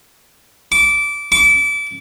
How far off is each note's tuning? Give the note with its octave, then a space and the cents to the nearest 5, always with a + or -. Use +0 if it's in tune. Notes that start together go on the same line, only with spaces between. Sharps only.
D6 -20
D6 -30